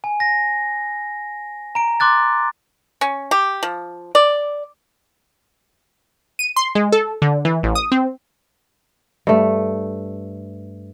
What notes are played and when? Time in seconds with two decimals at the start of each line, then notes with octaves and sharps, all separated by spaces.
0.04 G#5
0.20 A#6
1.75 A#5 D7
2.00 C6 D6 F#6 A6
3.01 C#4
3.31 G4
3.63 F3
4.15 D5
6.39 D#7
6.56 C6
6.75 G#3
6.92 A4
7.22 D3
7.45 E3
7.63 A1
7.75 D#6
7.92 C4
9.27 G2 A3